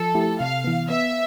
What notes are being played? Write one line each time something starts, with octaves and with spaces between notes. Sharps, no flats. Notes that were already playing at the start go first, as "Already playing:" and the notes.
Already playing: F3 A4
A3 E4 G4
C3 F5
E3 B3
B3 E5